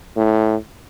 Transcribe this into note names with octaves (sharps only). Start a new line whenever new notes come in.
A2